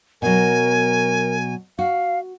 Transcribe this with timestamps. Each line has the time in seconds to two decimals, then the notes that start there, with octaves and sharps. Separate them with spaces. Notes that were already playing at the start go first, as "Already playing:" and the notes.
0.22 B2 F#3 A#4 G#5
1.79 F#4 F5